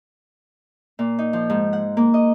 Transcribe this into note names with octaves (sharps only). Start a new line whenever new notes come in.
A#2
D#4
F3
G#2
F#5
A#3
D#5